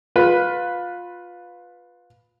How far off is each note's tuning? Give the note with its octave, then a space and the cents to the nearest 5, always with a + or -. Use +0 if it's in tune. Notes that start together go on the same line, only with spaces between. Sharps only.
F4 +20 B4 +0